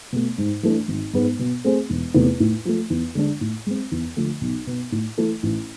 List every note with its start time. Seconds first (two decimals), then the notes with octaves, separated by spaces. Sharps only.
0.13 B2 A3
0.38 G#2
0.63 E3 A3 D4
0.88 G#1
1.13 G#2 G#3 B3
1.39 B2
1.64 A3 C4 G#4 C5
1.90 E1
2.14 E2 C3 E3 A3
2.40 A2
2.65 F3 A3
2.90 E2
3.15 D3 G#3 D4
3.41 A2
3.66 G#3 C4
3.92 E2
4.16 D3 F3 A3
4.41 B1
4.67 B2 B3
4.92 A2
5.18 E3 A3 E4 A4
5.43 A1